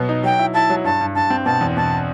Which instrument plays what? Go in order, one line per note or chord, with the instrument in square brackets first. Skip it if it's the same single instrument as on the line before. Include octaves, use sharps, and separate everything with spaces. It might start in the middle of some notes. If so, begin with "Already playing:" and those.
Already playing: [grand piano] B2 F#3 B3
D#4
[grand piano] F#3 [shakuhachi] G5
[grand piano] E4
[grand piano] E4 [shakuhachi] A5
[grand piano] F#3
[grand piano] G2 [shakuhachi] A5
[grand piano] G2
[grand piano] G2 [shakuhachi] A5
[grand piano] C4
[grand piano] B2 [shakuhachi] A5
[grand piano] E2
[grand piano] B2 [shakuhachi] A5